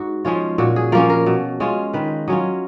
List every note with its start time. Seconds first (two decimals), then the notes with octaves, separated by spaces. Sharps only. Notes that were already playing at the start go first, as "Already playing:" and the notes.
Already playing: G#2 F#4
0.25 F3 G#3 C#4 F4
0.58 A#2 F#4
0.76 G#4
0.92 F3 A#3 C#4 A#4
1.10 A#4
1.26 B2
1.60 G#3 C#4 F4
1.93 D#3 B4
2.28 F#3 C#4 F4 D#5